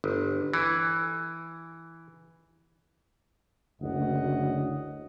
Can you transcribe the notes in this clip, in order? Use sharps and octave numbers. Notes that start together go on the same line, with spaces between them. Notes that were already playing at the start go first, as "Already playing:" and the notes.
G1
E3
F#1 D2 F#3 D#5 F#5